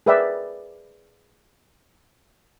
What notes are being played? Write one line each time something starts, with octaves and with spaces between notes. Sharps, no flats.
G#4 A#4 B4 D5 E5 G5